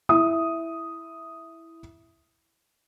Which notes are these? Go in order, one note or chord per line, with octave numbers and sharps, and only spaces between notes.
E4 E5 D#6